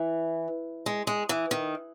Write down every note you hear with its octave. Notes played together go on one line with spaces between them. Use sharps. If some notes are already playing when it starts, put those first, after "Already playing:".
Already playing: E3
G#3
G#3
E3
D#3